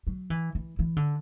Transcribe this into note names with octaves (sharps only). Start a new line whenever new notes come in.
F#3
E3
E3
E3
D3